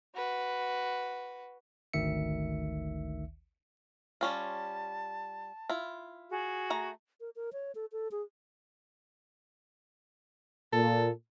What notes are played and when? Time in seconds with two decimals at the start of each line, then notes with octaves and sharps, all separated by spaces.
0.15 F#4 B4
1.93 G#1 D2 D#3 E5 C#7
4.21 G3 C#4 F4 A5
5.69 E4 F4
6.30 F#4 G#4
6.70 A3 A#5
7.21 A#4
7.36 A#4
7.53 C#5
7.75 A4
7.92 A4
8.12 G#4
10.73 A#2 A4